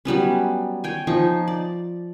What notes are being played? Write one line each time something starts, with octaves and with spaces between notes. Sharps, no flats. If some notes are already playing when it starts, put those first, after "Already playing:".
F#3 G3 B3 C#4
C#5 G5 G#5
F3 D#4 C#6
D5